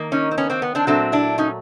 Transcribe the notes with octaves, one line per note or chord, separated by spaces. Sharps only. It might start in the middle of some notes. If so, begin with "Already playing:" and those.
Already playing: D#3 A#3
C#4 D#4
C4
B3 C#4
A#3 C4
B3
C4 D4
A#2 F#3 A3 C4 D4
D4 E4
C#4 D#4